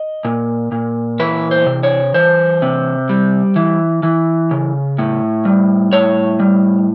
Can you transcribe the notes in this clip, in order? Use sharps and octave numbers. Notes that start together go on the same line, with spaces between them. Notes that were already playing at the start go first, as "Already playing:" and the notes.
Already playing: D#5
A#2
A#2
E3 B4
C5
C3
C#5
E3 C5
C3
G3
E3
E3
C#3
A2
G3
A2 C#5
G3